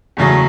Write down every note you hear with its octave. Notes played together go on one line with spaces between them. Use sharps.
F#1 E2 C#3 F#3 A3